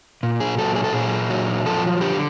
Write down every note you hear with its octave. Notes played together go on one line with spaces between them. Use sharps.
A#2
G#4
F#3 A4
G#4
A4
A#2 G#4
F#3
F3 A4
D3 G4